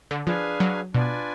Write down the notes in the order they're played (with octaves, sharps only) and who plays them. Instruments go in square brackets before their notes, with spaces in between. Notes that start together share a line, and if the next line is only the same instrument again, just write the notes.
[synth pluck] D3
[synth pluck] F3 [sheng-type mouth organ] D4 G#4 B4 F5 G#5
[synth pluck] F#3
[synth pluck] B2 [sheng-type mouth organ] D4 F4 B4 D5 G#5